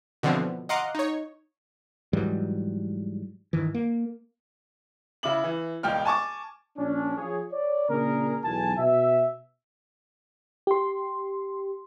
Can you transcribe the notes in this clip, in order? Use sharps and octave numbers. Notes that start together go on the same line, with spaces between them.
B2 D3 E3 F3 C4
B2
D#5 F5 F#5 A#5 C6 D6
D#4 C#5
G#2 E3 F#3 G3
G2 D#3 E3
A#3
C#3 E4 D6 F#7
E3
E1 C#2 G5 F6
G#5 A5 C#6 D6
A#1 C#4 D4
F3 F4 G#4 C#5
C#5 D5
A#2 C#3 A#3 D4 G#4 A#4
B1 E2 G#5 A5
B2 E5
G4 C6